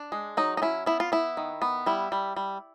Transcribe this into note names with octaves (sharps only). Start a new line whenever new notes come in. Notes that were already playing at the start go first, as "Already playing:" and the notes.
Already playing: D4
G#3
F#3 D#4
D#4
C#4 E4
B3 E4
F4
B3 E4
D#3
B3
G3 E4
G3
G3